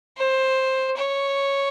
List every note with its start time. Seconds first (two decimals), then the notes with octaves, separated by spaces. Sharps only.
0.18 C5
0.96 C#5